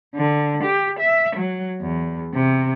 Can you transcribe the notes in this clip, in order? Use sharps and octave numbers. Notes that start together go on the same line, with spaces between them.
D3
G4
E5
F#3
E2
C3